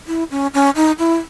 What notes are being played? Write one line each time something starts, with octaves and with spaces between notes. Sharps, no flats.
E4
C#4
C#4
D#4
E4